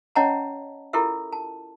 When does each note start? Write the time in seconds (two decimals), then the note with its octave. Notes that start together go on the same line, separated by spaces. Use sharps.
0.16 C#4 C#5 D#5 F#5 A5 A#5
0.93 E4 F4 G4 A4 A#4 E5
1.33 A5